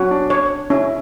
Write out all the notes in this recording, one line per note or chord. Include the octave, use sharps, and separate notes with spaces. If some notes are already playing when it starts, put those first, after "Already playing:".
Already playing: F#3 C#4 F#4
D4
C#5
C#4 E4